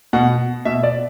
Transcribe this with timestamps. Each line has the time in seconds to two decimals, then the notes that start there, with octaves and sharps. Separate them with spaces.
0.13 B2 F#5
0.65 B2 E5
0.83 D5